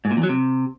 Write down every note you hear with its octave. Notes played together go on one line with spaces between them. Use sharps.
G#2
A#2
E2
F#3
C3